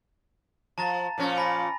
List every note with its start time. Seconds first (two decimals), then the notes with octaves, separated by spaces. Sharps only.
0.78 F3 A5 A#5 A6
1.18 A#2 F3 C#4
1.36 G#5 B5 A#6